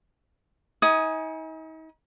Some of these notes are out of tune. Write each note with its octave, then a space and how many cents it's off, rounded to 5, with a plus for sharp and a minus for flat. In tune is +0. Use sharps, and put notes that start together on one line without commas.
D#4 +40 G#5 +0 D#6 +10